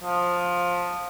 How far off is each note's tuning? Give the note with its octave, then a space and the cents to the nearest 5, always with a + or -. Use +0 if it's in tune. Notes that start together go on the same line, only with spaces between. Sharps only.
F3 +15